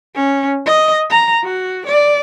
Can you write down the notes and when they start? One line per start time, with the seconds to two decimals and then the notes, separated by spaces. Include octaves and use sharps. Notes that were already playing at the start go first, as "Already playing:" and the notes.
0.15 C#4
0.66 D#5
1.10 A#5
1.44 F#4
1.87 D5